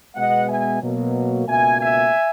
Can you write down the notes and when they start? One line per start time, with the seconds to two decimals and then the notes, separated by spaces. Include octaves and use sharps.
0.15 B2 G#3 B3 D#5 F#5
0.48 E5 G#5
0.81 B2 F#3 A#3
1.46 C#2 B2 A#3 E5 G#5
1.79 E5 G#5